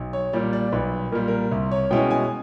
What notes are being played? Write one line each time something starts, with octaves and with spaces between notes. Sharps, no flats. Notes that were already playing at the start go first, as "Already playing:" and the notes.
Already playing: B1
C#5
A#2 G3 D5
D5
B1 B4
A#2 G3 A#4
A#4
C2
C#5
B2 G#3 C#4 E4 G5
G#5